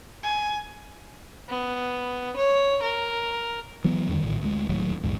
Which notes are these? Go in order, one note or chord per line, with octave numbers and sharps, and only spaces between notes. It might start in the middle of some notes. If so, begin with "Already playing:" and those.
G#5
B3
C#5
A#4
E3 F#3 B3
E2 D3 D#3 G3
A#1 A2 D3
D2 G#3
D1 D#2 A2 F#3
A#1 E2 G#2